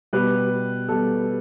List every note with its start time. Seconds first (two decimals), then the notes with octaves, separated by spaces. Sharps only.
0.13 B2 G3 G4 B4
0.88 B2 G3 A4